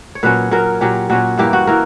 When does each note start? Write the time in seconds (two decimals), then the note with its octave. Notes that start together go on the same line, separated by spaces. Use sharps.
0.15 C#5
0.23 A#2 F#3 C#4 B4
0.51 A#2 F#3 C#4 A#4
0.81 A#2 F#3 C#4 G4
1.10 A#2 F#3 C#4 F#4
1.38 G2 E3 A#3 G4
1.53 F#4
1.67 E3 A#3 A#4